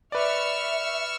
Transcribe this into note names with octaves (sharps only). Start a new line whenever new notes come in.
B4 D5 E5 C#6 E6 F6